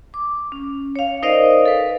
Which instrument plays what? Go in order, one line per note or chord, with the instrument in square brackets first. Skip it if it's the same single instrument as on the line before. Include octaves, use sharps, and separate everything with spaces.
[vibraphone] D6
C#4
C#5 F5
D#4 A#4 C5 D5 D#5 F5
A4 B4